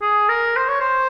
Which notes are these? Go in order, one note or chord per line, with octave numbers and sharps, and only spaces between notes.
G#4
A#4
C5
C#5
C5